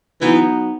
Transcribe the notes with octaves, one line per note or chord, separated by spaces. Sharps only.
E3 F#3 B3 D#4